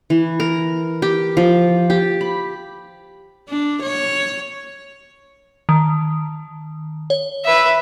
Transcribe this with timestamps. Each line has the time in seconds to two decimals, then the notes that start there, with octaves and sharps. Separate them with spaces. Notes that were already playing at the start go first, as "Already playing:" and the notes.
0.10 E3
0.40 A#4
1.02 G4
1.37 F3
1.90 G4
2.21 B5
3.49 D4
3.83 C#5
5.69 D#3
7.10 C#5
7.45 B4 E5